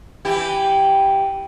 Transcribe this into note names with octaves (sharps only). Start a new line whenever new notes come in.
E3 E4 G4